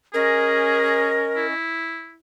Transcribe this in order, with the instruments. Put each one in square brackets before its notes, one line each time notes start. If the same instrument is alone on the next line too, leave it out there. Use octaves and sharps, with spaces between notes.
[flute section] C#4 D#5 [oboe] G#4 [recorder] A#4
[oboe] E4